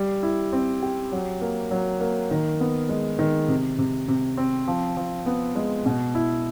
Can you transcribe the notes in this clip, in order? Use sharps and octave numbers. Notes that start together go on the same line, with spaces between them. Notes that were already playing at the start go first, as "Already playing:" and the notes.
Already playing: G3
E4
C4
G4
F#3
A#3
F#3
A#3
D#3
B3
G#3
D#3
C3
C3
C3
C4
F3
F3
B3
G#3
B2
E4